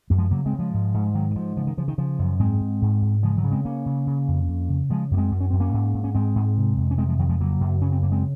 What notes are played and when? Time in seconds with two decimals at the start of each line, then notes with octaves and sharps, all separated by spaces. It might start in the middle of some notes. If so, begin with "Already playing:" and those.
0.10 F#2 A#3
0.18 F3 G#3
0.31 C#3 F#3 A#3
0.45 G#3 C4
0.53 C#3
0.59 F3 G#3
0.74 G#2
0.94 G#2
1.14 G#2 D#3 F#3
1.31 D#3
1.36 G#2 F3
1.57 C#3 F3
1.67 D#3
1.77 C#3 F3
1.88 D#3
1.98 C#3 F3
2.19 F#2
2.39 G#2 G#3 C4
2.61 G#2
2.82 G#2
3.02 G#2
3.22 C#3 F3 G#3
3.37 D#3 F#3
3.44 C#3
3.51 G#3 C4
3.65 C#3 A#3 C#4
3.86 C#3
4.07 C#3
4.28 F2
4.48 F2
4.69 C#3
4.90 C#3 F3 G#3
5.11 F#2 A#3
5.17 G#3 C4
5.31 F#2
5.41 C#4
5.50 F#2 C4
5.60 A#3 C#4
5.73 G#2
5.94 G#2
6.04 C#4
6.15 G#2 G#3 C4
6.35 G#2
6.57 C3
6.77 F2
6.91 C#4
6.98 C3 G#3 C4
7.09 F3 G#3
7.19 F2 D#3 F#3
7.29 F3 G#3
7.40 C#3 F#3 A#3
7.61 F#2
7.81 C#3 C#4
7.92 C4
8.03 F#2 A#3
8.11 G#3 C4